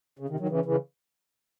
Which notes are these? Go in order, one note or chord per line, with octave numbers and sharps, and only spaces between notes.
C#3
C3 D#3
D#3 F#3
C#3 E3
C#3 E3